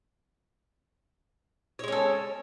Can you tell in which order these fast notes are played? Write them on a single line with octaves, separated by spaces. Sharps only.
C#5 G#3 C#4 A4